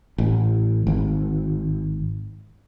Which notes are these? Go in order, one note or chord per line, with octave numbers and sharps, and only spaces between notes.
A1
G#1